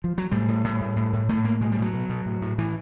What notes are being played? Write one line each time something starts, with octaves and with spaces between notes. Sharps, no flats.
F3
F#3
A2 G3
A2
A2
A2
A2
A2
A2 A3
A2 A#3
B2 G#3
G3
B2 F#3
B2
B2
A2
A2
A2 E3